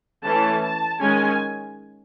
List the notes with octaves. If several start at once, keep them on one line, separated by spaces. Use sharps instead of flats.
E3 A3 C#4 A5
A5
D#3 G#3 C#4 G#5